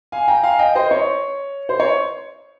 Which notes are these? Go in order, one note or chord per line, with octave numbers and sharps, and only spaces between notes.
F5 G#5
G5 A#5
F5 G#5
D#5 G5
C5 D#5
C#5
C5
C#5